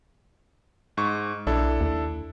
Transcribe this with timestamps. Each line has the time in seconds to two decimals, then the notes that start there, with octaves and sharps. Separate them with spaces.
0.97 G#2 C#6
1.47 B1 D4 E4 A4
1.80 D#2